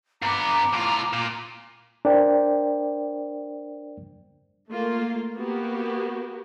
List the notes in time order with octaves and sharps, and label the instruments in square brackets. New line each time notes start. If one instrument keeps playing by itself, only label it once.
[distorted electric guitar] G2 B3 [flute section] A#5 D6
[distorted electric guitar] A2 F4
A#2
[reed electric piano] D4 A#4 C5 D5 G5
[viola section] A3 A#3 F4
A#3 B3 F#4 G4